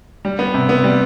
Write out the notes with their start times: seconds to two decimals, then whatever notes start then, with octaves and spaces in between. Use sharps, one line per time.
0.25 G3
0.39 B3
0.54 C3
0.69 B3
0.84 G3